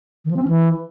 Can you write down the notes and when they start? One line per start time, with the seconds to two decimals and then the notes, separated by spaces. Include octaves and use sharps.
0.25 D#3
0.31 F3
0.36 C4
0.42 C#4
0.48 E3